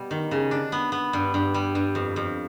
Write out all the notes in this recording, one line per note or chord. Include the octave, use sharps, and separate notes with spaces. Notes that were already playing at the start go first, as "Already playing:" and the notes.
Already playing: B2 G3
D#3
C#3
D4
B3
B3
G2
G2
G3
G2
F2
F2